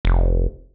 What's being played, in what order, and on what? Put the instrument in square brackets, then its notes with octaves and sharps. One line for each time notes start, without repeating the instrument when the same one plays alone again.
[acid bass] F1